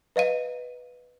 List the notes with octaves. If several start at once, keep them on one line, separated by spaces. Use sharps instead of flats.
B4 D#5 F5 D#7